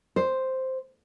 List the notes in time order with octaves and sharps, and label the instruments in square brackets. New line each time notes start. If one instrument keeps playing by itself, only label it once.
[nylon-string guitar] C5